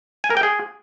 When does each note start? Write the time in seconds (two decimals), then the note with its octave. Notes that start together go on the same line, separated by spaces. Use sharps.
0.24 G#5
0.30 A#4
0.37 G5
0.43 G#4